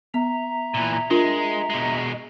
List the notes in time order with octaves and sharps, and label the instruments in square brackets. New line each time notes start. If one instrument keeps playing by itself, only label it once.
[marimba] B3 [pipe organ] E5 A#5
[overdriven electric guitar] A#2 E3
[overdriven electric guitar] G#3 [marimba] D4 F4 A#4
[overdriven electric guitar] B2 G#3